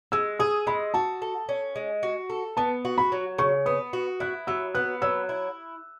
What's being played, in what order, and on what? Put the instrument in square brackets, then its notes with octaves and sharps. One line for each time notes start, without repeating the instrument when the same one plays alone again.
[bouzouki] G#3 [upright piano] E6
[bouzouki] G#4 [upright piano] D#6
[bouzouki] G#3 [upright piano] B5
[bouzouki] F#4 [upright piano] A5
[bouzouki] A4
C#4
G#3
F#4
A4
[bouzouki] B3 [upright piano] A5
[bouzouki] F#4
[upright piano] B5
[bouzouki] F#3
[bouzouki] C#3 [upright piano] C#6
[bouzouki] B3 [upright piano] D#6
[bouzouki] F#4
[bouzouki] E4 [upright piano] F#6
[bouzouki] F#3 [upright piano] E6
[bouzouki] B3 [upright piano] F#6
[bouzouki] F#3 [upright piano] E6
[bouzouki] E4